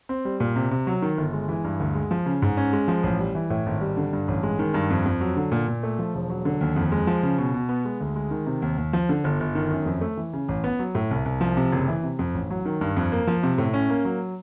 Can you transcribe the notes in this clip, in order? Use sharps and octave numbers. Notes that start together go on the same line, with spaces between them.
C4
G3
A#2
C3
C3
F#3
D#3
G1
G#3
E3
G2
D2
G#3
F3
C#3
G#2
C#4
G#3
F3
A1
G3
E3
A2
G#1
G3
D3
G2
A1
G#3
D#3
G2
F2
F2
F#3
D3
A#2
A#2
A3
F3
E1
F#3
D3
D#2
F2
G#3
F3
C#3
B2
B2
B3
G#3
D2
G#3
D#3
C3
D#2
D#2
F3
D3
G1
G1
D#3
F#2
F2
A3
E3
C#3
A1
B3
F#3
A2
C2
C2
F3
C3
F#1
E3
C3
F2
A1
F#3
D#3
G2
F2
A#3
F3
C3
A2
C#4
A#3
F#3